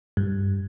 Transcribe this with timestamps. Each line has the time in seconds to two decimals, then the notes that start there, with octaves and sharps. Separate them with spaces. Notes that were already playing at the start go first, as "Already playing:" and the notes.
0.17 G2